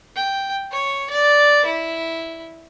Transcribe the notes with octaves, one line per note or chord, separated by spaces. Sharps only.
G5
C#5
D5
E4